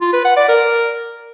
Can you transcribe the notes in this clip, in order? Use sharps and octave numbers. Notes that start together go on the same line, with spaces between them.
F4
B4
F#5
D5
A#4